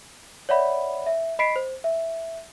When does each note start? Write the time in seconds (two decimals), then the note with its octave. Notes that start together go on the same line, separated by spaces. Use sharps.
0.49 C#5 D5 E5 F#5 B5
1.06 E5
1.39 D#5 B5 B6 C7 D7
1.56 C5
1.84 E5